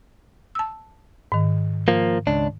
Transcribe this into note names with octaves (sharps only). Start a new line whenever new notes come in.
A5 E6
G#2 D#3
F3 A#3
C#2 D4